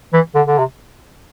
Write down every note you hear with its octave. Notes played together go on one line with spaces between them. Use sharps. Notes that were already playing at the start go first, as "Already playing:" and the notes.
E3
D3
D3
C3